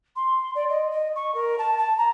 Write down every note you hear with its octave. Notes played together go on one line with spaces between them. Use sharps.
C6
D5
D#5
D#5
C#6
A#4
A5
A5
A#5